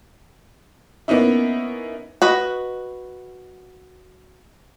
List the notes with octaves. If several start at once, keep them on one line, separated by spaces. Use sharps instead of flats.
A#3 B3 C#4 D#4 E4
F#4 B4 D#5